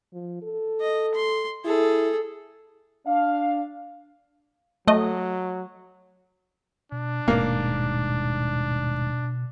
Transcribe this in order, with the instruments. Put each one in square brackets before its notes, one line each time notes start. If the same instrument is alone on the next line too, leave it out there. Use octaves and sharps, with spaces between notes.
[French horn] F3
A4
[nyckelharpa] D#5
C6
[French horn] E4 [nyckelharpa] G#4 A4
[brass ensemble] D4 F5
[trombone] F#3 [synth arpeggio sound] A3 D#5
[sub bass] B2 [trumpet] D4
[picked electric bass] D#1 G#2 [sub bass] B2 [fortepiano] A#3